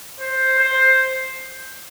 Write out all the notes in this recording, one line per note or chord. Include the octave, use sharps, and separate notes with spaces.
C5
C5